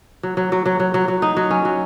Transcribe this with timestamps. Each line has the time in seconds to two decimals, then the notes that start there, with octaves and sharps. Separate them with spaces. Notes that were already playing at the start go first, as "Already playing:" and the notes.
0.23 F#3
0.37 F#3
0.52 F#3
0.66 F#3
0.80 F#3
0.94 F#3
1.08 F#3
1.22 D#4
1.37 F#3
1.51 C#4
1.65 F#3